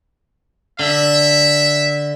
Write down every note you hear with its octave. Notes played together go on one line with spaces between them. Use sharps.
D3 E5